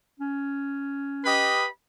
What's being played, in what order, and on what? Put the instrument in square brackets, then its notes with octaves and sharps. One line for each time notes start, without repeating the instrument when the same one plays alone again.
[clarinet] C#4
[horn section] G4 B4 D#5 [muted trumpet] B5